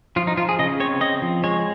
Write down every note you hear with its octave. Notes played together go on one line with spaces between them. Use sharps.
F3 F4
D#4
F3 F4
G#4
C#3 D#5
C4 C#5
C4 D#5
F3
G#3 C#5